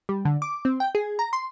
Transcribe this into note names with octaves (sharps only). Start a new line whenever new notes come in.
G3
D3
D6
C4
G5
G#4
A#5
C6